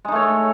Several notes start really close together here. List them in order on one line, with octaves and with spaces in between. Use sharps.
G#3 D#4 A3 C#5